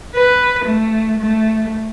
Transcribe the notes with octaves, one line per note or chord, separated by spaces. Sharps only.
B4
A3
A3